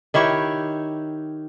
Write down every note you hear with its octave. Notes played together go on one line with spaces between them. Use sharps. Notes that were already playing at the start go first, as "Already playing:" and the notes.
D#3 E4 G4 C#5